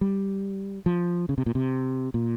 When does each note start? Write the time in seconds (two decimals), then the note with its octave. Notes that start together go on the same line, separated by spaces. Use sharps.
0.01 G3
0.86 F3
1.29 C#3
1.38 C3
1.46 A#2
1.55 C3
2.14 A#2